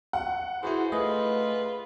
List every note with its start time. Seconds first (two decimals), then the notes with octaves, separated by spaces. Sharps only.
0.13 F#5
0.63 E3 E4 F#4 G#4 C5
0.92 A3 F4 G#4 B4 D#5